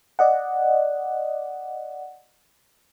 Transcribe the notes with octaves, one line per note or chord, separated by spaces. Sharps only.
D5 D#5 F#5